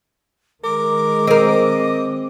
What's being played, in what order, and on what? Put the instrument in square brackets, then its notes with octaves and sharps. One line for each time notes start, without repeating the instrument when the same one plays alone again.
[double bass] D#3 G#3 [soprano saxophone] A#4 [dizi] D6
[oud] C4 A#4 [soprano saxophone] D#5